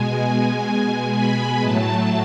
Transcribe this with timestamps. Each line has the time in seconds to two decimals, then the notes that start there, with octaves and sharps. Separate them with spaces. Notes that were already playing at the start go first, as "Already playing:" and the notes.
Already playing: B2 G#3 G#5
0.66 G#5
1.13 B5
1.60 A2 F#3 A3 A5